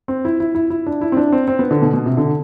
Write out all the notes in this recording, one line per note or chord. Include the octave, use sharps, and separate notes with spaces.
C4
E4
E4
E4
E4
D4
E4
C4
D4
C4
C4
B3
D3
B2
B2
C3
D3